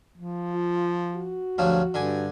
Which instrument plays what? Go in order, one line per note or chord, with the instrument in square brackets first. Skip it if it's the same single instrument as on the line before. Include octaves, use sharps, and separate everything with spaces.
[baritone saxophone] F3
[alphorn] F4
F#4
[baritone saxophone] D2 [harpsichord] G2 F3 F#3
[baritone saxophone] G2 [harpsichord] D3 G#5